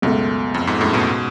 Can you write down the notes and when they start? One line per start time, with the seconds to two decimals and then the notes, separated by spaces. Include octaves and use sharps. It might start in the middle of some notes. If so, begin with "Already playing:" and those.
0.02 C#2 F#2 B2 A3
0.54 F2
0.67 F2 G#2
0.81 F#2 A2
0.93 G#2 B2